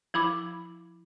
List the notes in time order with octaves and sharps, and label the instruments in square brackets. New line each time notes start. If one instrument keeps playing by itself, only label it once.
[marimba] F3 E4 B5 D6